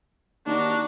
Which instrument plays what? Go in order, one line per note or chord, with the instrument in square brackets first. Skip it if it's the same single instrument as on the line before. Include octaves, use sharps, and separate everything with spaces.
[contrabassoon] D#2 [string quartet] D4 D#4 F#4